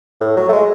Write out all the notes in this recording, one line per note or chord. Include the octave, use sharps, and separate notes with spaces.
A2
F#3
A3
G#3